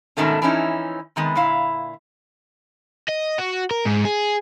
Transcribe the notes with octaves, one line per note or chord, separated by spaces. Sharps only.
G#2 B2 D#3 A3 C#4
E3 F3 C#4 D#4 E4
C3 D#3 G#3 B3
A#2 D3 E4 F5
D#5
F#4
A#4
G#2
G#4